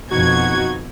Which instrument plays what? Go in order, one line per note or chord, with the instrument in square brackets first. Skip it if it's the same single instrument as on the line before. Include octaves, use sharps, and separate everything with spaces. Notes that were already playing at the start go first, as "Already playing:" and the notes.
[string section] F2 B2 G#6 [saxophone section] D#4 F#4